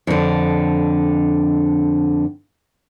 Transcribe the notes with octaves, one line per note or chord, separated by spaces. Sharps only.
F2 D3